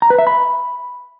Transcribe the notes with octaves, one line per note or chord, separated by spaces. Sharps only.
A#5
B4
E5
B5